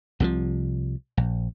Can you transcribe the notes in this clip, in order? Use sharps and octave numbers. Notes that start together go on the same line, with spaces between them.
C2 C3 E3 F3
A#1